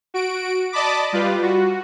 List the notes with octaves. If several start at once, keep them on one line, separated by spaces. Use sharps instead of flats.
F#4 D7
D5 D#5 A5 B5 D6
G3 F4 B4
F#4